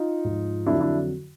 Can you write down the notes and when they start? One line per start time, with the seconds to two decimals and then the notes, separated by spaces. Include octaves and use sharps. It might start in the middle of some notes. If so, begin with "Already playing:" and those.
Already playing: D#4 F4
0.25 G#2 F3
0.66 F2 D3 F#3 D4 E4
0.80 D4 E4